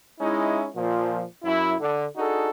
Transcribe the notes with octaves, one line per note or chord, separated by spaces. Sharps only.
G#3 C#4 D#4 E4
A#2 F3
F#2 E4
D3
D4 D#4 F#4 G#4 A4